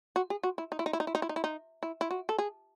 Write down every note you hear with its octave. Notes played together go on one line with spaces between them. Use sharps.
F#4
G#4
F#4
E4
D#4
E4
D#4
E4
D#4
E4
D#4
E4
D#4
E4
D#4
E4
E4
F#4
A4
G#4